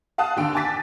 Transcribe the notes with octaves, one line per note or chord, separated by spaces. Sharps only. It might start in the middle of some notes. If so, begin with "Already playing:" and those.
F5 F#5 A5 D#6 F#6
D#2 D3 G5 D7
G#5 A5 D6 A6 B6